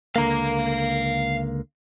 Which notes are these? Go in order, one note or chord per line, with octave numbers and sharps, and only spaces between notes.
C#2 D3 A#3 F5 A#5